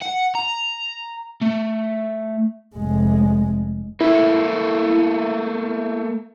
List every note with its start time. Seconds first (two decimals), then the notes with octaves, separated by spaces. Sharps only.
0.02 F#5
0.35 A#5
1.42 A3
2.76 F1 G#3
4.01 A3 A#3 E4